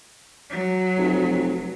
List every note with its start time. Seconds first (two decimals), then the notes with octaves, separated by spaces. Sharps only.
0.50 F#3
0.98 F1